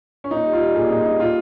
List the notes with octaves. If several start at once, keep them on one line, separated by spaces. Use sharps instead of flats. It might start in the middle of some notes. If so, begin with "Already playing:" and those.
C#4
A#2 D#4
G3
F4
G3
A#2 G#4
A#2 D#4
G3 D#4
A#2 F4